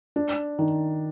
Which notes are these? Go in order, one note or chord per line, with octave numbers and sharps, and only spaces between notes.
D4
D#3